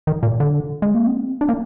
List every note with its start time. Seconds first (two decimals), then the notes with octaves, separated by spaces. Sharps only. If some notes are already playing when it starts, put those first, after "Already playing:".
0.07 D#3
0.23 A#2
0.40 D3
0.82 G#3
0.94 A#3
1.07 C4
1.41 D4
1.49 A#3